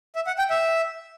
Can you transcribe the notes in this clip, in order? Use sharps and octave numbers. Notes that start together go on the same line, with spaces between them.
E5
F#5
G5
E5